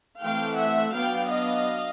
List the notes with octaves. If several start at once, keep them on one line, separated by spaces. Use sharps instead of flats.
E3 A3 C4 F5 G5
E5 F#5
F#3 B3 D4 F5 G5
D#5 F5